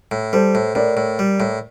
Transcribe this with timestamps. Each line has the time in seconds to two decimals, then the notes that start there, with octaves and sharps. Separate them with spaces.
0.11 A2
0.33 G3 A4 C5
0.55 A2
0.75 A2 A#4 D5
0.97 A2
1.19 G3
1.40 A2